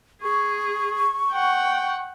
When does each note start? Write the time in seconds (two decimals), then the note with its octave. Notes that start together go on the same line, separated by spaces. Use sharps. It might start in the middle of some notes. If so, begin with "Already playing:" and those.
0.23 G#4 C#6
1.32 F#5 G5